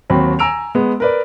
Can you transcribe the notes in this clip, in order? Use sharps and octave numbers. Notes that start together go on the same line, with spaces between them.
D#2 F#3 C4 B5
G#5 A#5 E6 D7 F7
G#3 B3
A#4 B4 D5